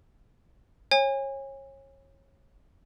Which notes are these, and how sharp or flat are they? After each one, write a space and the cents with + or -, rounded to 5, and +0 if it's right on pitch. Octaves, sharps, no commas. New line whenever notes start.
C#5 -25 G#5 -30